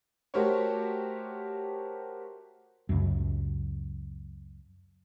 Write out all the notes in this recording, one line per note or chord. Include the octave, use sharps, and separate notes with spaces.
A3 F#4 G4 A#4 C5 C#5
C#2 F#2